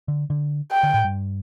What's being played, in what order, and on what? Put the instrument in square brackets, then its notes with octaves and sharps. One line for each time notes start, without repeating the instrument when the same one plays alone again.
[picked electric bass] D3
D3
[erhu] G5
[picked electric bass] D3
A2
G2